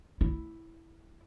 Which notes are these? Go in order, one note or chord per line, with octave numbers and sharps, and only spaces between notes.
E4